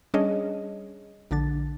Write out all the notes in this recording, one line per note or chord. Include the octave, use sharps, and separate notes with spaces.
G3 C#4 D4 G#4 C#5 D#5
A#1 D3 D4 A6